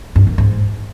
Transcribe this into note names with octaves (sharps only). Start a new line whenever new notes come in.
G2
F#2
G#2